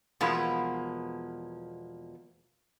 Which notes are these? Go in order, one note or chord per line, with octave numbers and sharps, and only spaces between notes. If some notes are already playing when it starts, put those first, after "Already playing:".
E2 B2 F3 G#3 A#3 E4